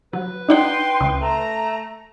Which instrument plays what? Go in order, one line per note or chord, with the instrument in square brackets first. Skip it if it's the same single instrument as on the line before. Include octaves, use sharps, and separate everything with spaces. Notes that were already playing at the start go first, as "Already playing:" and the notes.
[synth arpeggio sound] F#3 [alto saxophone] B4
[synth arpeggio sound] D4 D#4 F#5 [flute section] G5 C6
[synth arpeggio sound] C#2
[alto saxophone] A3 [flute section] A#5